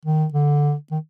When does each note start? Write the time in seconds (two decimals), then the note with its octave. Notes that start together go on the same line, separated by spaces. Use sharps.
0.05 D#3
0.34 D3
0.91 D#3